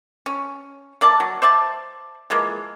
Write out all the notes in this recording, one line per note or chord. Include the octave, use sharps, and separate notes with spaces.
C#4
A#3 D5 E5 A5
F#3
C5 D5 E5 A5
E3 F3 G#3 A#3